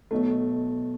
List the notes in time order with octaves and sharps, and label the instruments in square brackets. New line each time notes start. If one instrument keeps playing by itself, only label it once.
[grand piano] B1 B2 A3